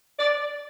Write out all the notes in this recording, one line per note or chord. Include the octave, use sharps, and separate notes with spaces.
D5